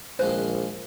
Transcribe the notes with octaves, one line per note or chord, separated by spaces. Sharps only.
A#1 D#3 F3 G#3 C5